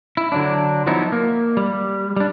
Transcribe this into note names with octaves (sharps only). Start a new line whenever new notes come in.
E4
D3 F#3 D4
F3 F#3 B3 D#4 E4
A#3
G3
G3 D4